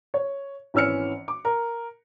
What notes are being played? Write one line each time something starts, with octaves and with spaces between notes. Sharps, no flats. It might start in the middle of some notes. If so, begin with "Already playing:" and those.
C#5
G#1 E3 C#4 E6 F6 C#7
D6
A#4